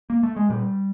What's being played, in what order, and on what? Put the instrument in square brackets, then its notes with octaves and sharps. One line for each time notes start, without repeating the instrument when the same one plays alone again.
[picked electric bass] A#3
A3
G#3
A#2 G3